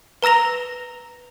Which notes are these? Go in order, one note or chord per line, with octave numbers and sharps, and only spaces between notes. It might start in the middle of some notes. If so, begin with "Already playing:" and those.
B4 A#5 E6 A#6 F7